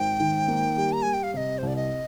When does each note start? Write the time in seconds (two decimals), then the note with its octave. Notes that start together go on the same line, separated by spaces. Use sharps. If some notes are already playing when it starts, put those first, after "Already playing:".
Already playing: G#1 G5
0.20 D#3
0.48 A#3
0.76 G3
0.93 A#5
1.02 G3 G#5
1.13 G5
1.23 F5
1.33 C3 D#5 F5
1.58 C5
1.62 C2
1.67 D5
1.76 D#5